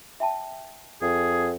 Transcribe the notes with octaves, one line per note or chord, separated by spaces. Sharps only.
E5 G5 A5
F2 G#4